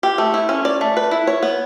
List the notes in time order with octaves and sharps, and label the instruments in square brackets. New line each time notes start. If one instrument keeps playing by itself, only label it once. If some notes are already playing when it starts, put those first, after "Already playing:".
[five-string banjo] G4
A3
E4
C#4
D5
A3
B4
E4
C#5
B3